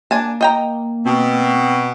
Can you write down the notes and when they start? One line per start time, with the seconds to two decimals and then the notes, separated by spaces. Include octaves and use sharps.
0.11 A#3 D4 G#5 A5
0.41 D#5 G5 A#5
1.05 B2 C4